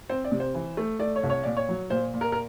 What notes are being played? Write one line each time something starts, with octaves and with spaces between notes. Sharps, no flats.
C4 C5
D5
C3
C5
E3
A3
A3 D5
C#5
C2
C#5
A#2 D5
C#5
F#3
A#2 C5
A#2
A#4
A#4